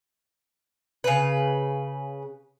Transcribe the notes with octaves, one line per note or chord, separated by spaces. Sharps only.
C#3 B4